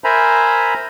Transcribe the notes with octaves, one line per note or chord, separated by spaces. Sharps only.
A#4 C5 E5 G#5 A#5 B5